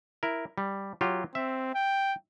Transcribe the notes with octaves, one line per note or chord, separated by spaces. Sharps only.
E4 A#4
G3
F#3 F4 G4
C4 E5
G5